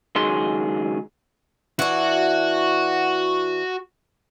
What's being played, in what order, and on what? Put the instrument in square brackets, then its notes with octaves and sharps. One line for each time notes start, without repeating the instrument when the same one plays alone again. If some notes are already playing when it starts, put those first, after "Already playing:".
[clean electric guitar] C#2 D#3 F#3 G#4 C6
[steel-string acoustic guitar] E3 D4 [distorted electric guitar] F#4